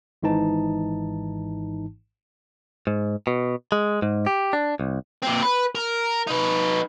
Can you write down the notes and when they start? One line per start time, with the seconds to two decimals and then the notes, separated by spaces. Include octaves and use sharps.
0.23 G#1 G#2 E3 D#4 A5
2.87 G#2
3.27 B2
3.72 G#3
4.02 G#2
4.27 G4
4.53 D4
4.80 C2
5.22 A#2 C4
5.42 B4
5.75 A#4
6.28 D#4 B4